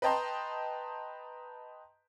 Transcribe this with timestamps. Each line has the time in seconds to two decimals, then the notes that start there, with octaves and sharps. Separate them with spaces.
0.02 B4 D#5 G5 A5 A#5 C6